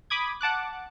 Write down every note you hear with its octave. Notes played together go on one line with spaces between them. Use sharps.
B5 D6 D#6 G#6
F#5 A5 D6 F#6